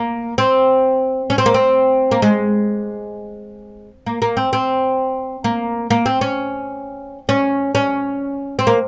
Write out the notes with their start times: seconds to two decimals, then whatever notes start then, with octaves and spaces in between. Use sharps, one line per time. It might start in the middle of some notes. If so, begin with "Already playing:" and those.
Already playing: A#3
0.38 C4
1.30 C#4
1.38 C4
1.46 A#3
1.54 C4
2.11 A#3
2.22 G#3
4.06 A#3
4.22 A#3
4.37 C4
4.53 C4
5.44 A#3
5.90 A#3
6.06 C4
6.21 C#4
7.29 C#4
7.75 C#4
8.59 C4
8.67 A#3